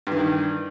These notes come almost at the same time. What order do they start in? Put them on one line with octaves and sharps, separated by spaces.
G2 E3 D#3